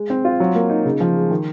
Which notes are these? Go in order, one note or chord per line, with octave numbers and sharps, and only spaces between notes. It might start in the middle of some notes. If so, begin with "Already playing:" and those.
Already playing: G#3
C4
F4
F#3
A#3
D#4
C#3
F3
G#3
D#3